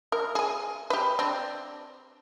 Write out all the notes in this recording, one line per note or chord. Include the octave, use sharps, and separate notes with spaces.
A#4
G#4 G#5
G4 B4
C4 D4